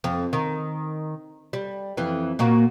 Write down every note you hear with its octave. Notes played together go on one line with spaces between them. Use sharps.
F2
D#3
G3
F2 E3
A#2 A#3 F#4